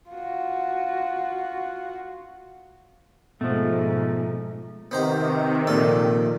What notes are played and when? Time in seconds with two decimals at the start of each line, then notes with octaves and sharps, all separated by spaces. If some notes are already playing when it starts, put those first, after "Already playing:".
0.10 F4 F#4
3.41 G#2 B2 F3 A3
4.91 C3 D#3 B3 C5 A#5
5.67 A#1 A#2 A4